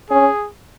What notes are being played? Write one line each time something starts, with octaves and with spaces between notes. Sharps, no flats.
C#4 G#4